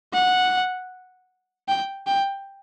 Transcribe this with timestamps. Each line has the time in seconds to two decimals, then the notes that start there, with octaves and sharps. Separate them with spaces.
0.13 F#5
1.68 G5
2.07 G5